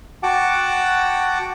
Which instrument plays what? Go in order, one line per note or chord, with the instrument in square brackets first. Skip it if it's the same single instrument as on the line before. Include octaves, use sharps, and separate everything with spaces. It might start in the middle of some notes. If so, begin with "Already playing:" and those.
[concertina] F#4 F#5 G5 A5 D6